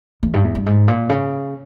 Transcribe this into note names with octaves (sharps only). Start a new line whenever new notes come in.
E2
G2
E2
G2
G#2
A#2
C#3